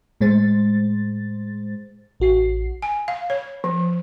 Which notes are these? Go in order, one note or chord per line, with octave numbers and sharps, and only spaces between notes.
A2 G#3 C5 A6
A1 F#4 C7
G#5
F5
C#5
F3